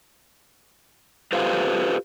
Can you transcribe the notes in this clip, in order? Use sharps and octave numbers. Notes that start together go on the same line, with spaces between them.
F4 G4 A4 B4 C5 F5